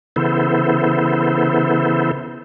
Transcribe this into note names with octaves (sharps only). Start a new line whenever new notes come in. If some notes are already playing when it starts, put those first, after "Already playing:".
C#3 E3 B3 E4 A4 C5